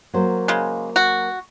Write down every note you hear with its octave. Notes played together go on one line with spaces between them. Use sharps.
F#3 A#3 C5
C#3 G#3
F#4